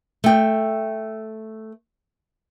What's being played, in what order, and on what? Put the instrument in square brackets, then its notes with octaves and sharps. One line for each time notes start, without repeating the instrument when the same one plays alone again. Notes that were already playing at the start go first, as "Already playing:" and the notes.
[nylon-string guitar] A3 G5